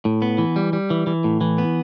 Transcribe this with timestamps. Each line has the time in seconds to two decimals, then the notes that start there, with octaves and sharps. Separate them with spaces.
0.05 A2
0.22 B3
0.38 E3
0.56 G3
0.73 G3
0.90 E3
1.07 E3
1.24 A2
1.41 E3
1.58 B3